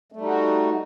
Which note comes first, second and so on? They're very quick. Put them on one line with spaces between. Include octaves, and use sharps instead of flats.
A3 G3 D#4 F#4